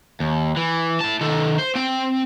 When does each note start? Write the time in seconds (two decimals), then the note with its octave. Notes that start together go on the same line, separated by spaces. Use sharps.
0.20 D#2
0.57 E3
1.01 E4 A5
1.21 D#3 A4
1.59 C5
1.75 C4 G5